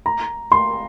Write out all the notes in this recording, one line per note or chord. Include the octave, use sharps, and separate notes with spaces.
A#5
C6